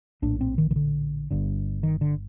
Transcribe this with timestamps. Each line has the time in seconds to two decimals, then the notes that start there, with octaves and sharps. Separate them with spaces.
0.22 A#1 A2 D4
0.41 C4
0.58 D#3
0.71 D#3
0.76 D3
1.31 G1 G2 D3
1.83 D#3
2.01 D3